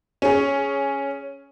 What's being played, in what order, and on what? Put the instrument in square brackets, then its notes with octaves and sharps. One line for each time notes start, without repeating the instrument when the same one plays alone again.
[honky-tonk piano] C#4 G#4